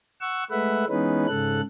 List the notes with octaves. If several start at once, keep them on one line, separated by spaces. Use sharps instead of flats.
F#5 C#6 E6
G#3 A3 B4 E5 F#5
E3 G#3 B3 C#4 D#4 B4
G#2 C#3 A4 F#6